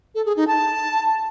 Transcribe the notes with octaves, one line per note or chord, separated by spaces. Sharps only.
A4
G#4
D#4
A5